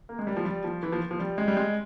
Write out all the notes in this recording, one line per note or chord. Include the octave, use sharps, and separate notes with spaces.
A#3
G#3
G3
F3
G3
F3
E3
F3
F3
G3
G#3
G3
G#3